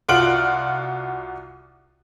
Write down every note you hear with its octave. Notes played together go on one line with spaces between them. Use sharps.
C2 F4 F#4 D7 F#7